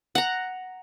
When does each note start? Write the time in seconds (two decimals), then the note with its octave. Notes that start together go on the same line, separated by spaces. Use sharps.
0.15 F#5 A#5